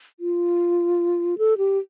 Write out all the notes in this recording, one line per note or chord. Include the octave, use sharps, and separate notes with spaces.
F4
A4
G4